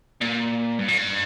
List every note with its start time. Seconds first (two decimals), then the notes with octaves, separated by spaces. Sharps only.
0.21 A#2
0.79 G2
0.88 A#2
0.98 G2